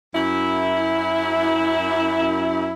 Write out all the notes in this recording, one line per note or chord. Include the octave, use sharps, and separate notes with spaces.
F#2 E4